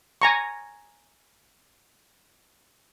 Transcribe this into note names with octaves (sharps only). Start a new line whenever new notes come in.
G#5 A#5 C#6